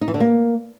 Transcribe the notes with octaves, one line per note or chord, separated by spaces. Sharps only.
D#4
E3
D3
A#3